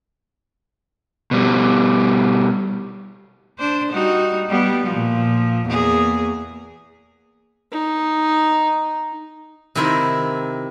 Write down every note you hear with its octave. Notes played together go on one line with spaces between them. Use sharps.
B2 G3
D4 C5
G3 D#4 F#4
G3 B3
A#2 F3
E2 A#3 G#4
D#4
C3 D#3 C4 E4 A#4 C5